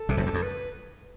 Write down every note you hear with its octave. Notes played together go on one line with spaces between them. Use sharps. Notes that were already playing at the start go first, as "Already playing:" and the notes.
Already playing: A4
C2 C3
F#1 F#2
E2
F2
B4